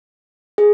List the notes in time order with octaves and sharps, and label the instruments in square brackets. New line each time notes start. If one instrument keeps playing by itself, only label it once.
[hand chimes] G#4